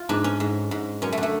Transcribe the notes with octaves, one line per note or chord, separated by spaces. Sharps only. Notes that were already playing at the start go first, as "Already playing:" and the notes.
Already playing: F4
G#2 D4
C#4
G#2
G#2
F#2 C#4
A3
D3
A3